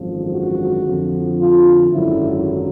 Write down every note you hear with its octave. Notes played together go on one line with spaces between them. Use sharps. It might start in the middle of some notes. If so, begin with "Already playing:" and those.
Already playing: G#1 F#2 D3 F3
F#4
F2 D3 F3
F4
G#1 F#2 D3 F#3 E4